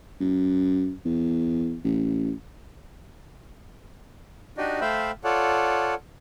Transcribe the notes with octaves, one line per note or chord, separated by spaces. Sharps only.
F#2
E2
A1
D4 D#4 F#4 G4 D5 D#5
A3 C5 E5 F5 G5 B5
F4 A4 C#5 D5 F#5